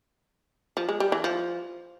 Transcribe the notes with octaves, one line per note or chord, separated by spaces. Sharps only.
F3
G#3
G3
E3
F3